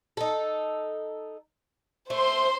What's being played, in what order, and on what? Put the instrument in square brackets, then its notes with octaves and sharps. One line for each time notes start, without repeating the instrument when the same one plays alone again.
[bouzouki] D#4 A4
[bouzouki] A3 [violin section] C5 C6